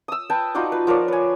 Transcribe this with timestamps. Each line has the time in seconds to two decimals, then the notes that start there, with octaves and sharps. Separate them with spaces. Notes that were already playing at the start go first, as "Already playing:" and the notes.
0.08 D#6 E6
0.30 B4 G5 A5
0.55 D#4 F4 F#4 D5
0.72 B4
0.87 F3 A#4 C#5 D5
1.08 B4 G#5